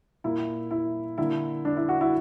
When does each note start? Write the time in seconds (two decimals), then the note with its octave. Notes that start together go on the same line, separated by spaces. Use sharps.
0.24 A#2 A#3 E4
0.71 E4
1.18 D3 A#3 E4
1.65 D4
1.77 E4
1.89 F#4
2.01 E4